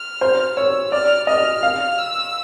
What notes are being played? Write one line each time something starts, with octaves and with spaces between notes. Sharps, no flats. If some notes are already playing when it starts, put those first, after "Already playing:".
Already playing: F6
C5
C#5 E6
D5 F6
D#5 F6
F5
E6